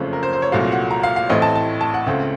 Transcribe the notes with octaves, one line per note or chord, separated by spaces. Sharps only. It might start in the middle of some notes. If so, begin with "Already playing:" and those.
Already playing: F#1 F2 C#3 A3
A#4
C5
C5
C#5
C2 A#2 F#3 A3 F5
F#5
A#5
F5
F5
A1 A2 A3 C4 D#5
A5
A5
A5
F#5
C#2 C#3 A3 C4